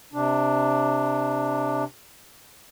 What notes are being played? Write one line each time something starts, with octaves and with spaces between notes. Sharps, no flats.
C3 D4